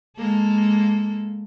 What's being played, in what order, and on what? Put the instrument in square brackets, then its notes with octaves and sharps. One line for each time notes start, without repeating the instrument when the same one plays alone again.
[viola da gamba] G#3 A#3 A4